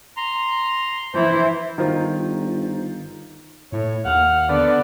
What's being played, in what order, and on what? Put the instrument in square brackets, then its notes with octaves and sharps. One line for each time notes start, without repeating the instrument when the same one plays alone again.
[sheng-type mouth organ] A#5 C6
[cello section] E3 E4 [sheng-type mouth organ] C5
[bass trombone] G1 [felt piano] D#3 F4 [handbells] D#4 C5
[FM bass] A2 [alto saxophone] C#5
[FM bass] D#2 [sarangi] F5 [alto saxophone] F#5
[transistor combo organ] D3 B3 [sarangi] D5